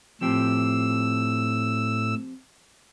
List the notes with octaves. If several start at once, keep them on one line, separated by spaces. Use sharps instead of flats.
A2 F3 C4 G4 E6